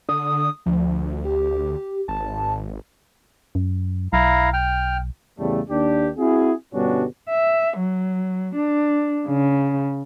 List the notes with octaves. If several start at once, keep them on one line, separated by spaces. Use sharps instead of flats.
D3 D#6
D2 F3
G4
G#1 A5
F#2
B1 E4 F5 A#5
G5 F6
E2 A2 C#3 G3 A3
D#2 D4 G4
C4 E4 F#4 G#4
G1 B2 G3 C#4 D4 F#4
E5
F#3
D4
C#3